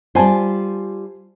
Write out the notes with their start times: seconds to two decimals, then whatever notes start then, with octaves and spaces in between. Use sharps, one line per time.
0.15 G3 F4 C5 G#5 A5